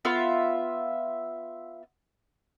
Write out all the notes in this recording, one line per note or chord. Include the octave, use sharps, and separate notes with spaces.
B3 F4 E5